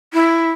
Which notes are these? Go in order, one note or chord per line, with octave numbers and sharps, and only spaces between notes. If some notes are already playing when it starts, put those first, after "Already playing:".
E4